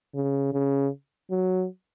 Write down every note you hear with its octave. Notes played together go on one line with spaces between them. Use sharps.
C#3
C#3
F#3